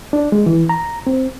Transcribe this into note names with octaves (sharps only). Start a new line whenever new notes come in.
D4
G#3
E3
A#5
C4